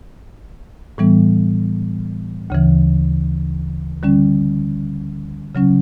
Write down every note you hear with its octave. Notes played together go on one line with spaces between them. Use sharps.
A2 E3 G3 B3
D2 C#3 E3
D3 G3 C#4
C#3 F#3 C#4